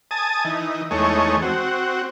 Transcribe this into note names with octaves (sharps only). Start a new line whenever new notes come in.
G#5 A5 D#6
E3 D#4
E2 G#3 A3 D#4 C#5
C4 F#4